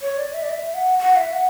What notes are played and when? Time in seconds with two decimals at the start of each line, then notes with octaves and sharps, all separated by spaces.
0.02 C#5
0.18 D5
0.34 E5
0.43 D5
0.50 E5
0.74 F#5
0.99 F#5
1.16 E5
1.33 F#5